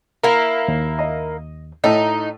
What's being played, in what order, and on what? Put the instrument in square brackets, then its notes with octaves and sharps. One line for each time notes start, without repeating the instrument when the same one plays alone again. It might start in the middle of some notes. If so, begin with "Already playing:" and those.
[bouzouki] A#3 E4 [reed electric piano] A#4
[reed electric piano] D#2
[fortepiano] D#5
[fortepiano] A2 A3 [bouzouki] D#4